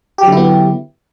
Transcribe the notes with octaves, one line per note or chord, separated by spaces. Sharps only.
D3 F#3 B3 E4 G4